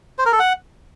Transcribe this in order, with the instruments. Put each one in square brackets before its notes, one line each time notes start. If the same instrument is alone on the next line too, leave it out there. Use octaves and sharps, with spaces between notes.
[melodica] C5
A#4
A4
F#5